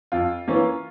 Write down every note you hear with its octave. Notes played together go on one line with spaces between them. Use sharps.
F2 F4
E3 A#3 C#4